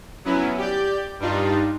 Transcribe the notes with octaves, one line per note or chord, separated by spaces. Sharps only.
F#3 B3 C#4 E4
G4 D5 G6
G2 G3 D4 D#4 F4